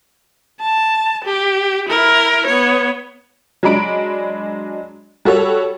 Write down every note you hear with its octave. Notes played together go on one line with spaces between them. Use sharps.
A5
G4
E4 A#4
B3 C#5
F#3 G#3 D4 B5 D7
G3 F#4 A4 C#5